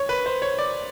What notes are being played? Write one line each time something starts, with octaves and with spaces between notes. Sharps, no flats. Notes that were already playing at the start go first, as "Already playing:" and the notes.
Already playing: C#5
B4
C5
C#5
D5